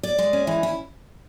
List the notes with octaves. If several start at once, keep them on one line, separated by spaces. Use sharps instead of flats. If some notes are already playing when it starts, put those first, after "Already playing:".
D5
G#3
C#4
E3
E4